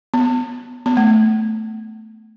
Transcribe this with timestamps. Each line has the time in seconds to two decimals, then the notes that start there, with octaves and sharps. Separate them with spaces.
0.14 B3
0.86 B3
0.97 A3